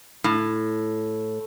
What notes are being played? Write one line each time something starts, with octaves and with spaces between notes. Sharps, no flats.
A2